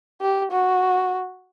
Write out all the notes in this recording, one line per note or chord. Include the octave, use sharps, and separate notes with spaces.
G4
F#4